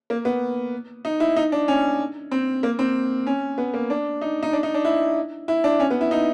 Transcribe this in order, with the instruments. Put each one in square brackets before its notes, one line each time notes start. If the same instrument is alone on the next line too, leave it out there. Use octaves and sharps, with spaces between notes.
[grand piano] A#3
B3
D#4
E4
D#4
D4
C#4
C4
A#3
C4
C#4
B3
A#3
D4
D#4
D#4
D4
D#4
D4
E4
E4
D4
C#4
B3
E4
D#4